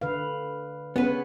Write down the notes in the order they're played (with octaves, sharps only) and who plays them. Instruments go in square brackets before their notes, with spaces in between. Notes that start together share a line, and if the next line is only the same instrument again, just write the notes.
[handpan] D3 B4 F5
[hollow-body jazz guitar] B3 B4 [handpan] C#4 G#4 F#5